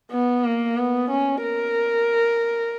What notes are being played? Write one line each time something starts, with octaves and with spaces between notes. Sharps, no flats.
B3
A#3
B3
C#4
A#4